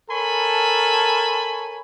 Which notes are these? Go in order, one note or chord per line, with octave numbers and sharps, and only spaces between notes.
A4 A#4 C#5 G#5 A5 B5